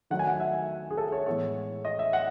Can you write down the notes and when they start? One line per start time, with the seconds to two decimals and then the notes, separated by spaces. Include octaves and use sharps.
0.10 D#3 F#3 A3 D#4 F#5
0.19 G#5
0.27 F#5
0.40 E5
0.91 G#4
0.97 A4
1.12 C#5
1.26 A2 E3 G#3 B3 C#5
1.85 D#5
1.99 E5
2.13 F#5